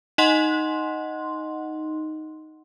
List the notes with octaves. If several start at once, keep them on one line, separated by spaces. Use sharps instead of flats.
D#4 D#5 F#5 C6